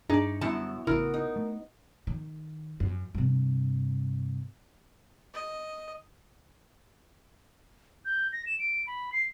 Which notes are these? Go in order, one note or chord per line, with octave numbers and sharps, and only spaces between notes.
G2 D4 D#4 G#4 C#5 D5
F#2 D3 G3 B3 E4 F#4 A5
A1 C#3 B3 E4 F#4 A#4
D#4
A3
D#3
F#2
G2 C3
D#5
G6
A#6
E7
D7
B5
C7